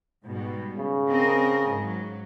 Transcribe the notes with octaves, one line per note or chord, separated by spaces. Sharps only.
G#2 B2 G3
C#3
C4 A#4 D#5
G#2 F#3